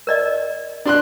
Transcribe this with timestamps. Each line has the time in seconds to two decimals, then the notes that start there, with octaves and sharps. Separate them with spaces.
0.07 A#4 D5 D#5
0.86 D4 C6 F#6